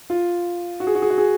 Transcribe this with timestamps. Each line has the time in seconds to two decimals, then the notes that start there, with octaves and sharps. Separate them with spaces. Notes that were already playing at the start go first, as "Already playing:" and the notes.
0.10 F4
0.80 F#4
0.87 G#4
0.95 F#4
1.02 G#4
1.10 F#4
1.18 G#4